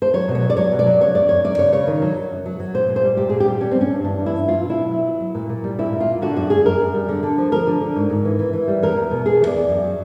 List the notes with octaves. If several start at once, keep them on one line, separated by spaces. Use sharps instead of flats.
C5
F#3 C#5
B2
C#5
F#3
D5
F#3 C#5
B2
D5
F#3
C#3 C#5
F#2 D5
F#2 C#5
F#2 D5
C#3 C#5
C#3 C#5
D#3
F#3
F#3
F#2
F#3
F#3
A#2 C5
A#2
C5
G3
A#2 G4
A#2 G#4
G4
G3
G3 C#4
C4
G2
C#4
G2
E3 D4
G2
E4
G2
F#3 F4
B2
E4
B2
F#3
F#3
F#3
A#2
A#2
G3
A#2 E4
A#2
F4
A#2
D3 F#4
F#2 F#4
G3 G#4
F#2 A#4
F#2
G3
D3
D3
F3
F3 A#4
D3
D3
G#2
G#2
E3
E3
E3
G3
E2 A#4
E2
B2
B2 G#4
E2
D5
E2
F#2
F#3